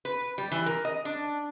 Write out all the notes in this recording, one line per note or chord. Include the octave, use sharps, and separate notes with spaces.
B4
G3
E3
A#4
D#5
D4